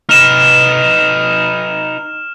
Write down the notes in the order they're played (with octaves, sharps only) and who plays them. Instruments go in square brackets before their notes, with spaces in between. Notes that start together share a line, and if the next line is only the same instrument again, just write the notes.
[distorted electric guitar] D#4 B4 [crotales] F6 E7